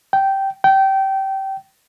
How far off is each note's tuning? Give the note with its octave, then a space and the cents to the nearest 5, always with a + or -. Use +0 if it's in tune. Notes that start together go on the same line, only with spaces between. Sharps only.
G5 -10
G5 -20